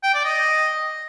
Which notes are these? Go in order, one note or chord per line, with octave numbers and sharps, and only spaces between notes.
G5
D5
D#5